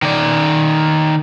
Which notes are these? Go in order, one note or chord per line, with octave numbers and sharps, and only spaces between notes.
D#3 D5